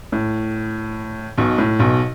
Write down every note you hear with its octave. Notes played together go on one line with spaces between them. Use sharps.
A2
B1 B2
A2
B1 B2